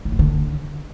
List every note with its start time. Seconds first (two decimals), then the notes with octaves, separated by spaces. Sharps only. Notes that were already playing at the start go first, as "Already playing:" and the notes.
0.05 A2
0.12 F#2
0.19 D3